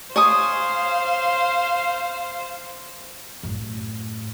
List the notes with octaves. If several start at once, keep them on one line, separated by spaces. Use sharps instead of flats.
C5 C#5 F5 G#5 D#6
F#2 A2